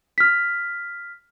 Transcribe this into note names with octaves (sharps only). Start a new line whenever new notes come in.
F6 B6